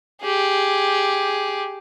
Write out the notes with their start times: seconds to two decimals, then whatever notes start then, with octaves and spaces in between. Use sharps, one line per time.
0.21 G4 G#4